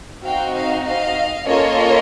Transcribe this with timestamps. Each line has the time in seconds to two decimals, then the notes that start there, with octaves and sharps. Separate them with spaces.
0.24 C4 D#4 F#4 F5 G5
0.54 D#5 F5
0.85 D#5 F5
1.47 A#3 C#4 F4 A4 C#5 D#5